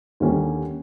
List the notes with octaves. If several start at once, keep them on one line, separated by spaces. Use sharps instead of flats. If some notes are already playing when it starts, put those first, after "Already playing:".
D#2 D3 G3 C#4